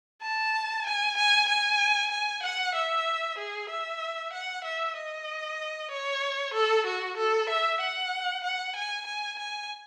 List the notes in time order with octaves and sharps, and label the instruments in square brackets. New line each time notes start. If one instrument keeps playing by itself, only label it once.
[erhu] A5
G#5
G#5
G#5
G#5
F#5
E5
G#4
E5
F#5
E5
D#5
C#5
A4
F#4
A4
E5
F#5
F#5
G#5
G#5
G#5